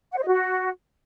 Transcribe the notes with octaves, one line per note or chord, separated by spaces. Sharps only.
F#5
C5
D#5
F#4